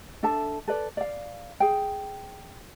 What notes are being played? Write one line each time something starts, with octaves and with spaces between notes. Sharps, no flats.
D4 A4 E5 A5
A4 B4 D5
D5 F5
G#4 G5